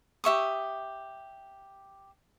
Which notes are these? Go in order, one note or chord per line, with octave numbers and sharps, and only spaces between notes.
G4 E5 C#6 D#6